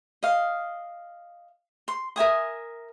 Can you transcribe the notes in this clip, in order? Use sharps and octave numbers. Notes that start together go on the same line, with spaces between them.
D#5 F5
C6
A#4 E5 G#5 D#6